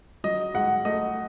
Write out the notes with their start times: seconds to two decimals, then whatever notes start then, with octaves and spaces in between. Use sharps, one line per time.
0.24 F#3 D#5
0.54 G#2 F#5
0.85 A3 D#5